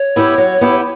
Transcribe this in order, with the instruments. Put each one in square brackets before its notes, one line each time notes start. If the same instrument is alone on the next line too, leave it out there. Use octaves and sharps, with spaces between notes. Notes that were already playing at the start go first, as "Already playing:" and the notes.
Already playing: [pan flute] C#5
[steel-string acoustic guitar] B3 E4 G4
F#3
B3 E4 G4